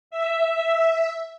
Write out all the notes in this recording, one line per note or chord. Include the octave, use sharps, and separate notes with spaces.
E5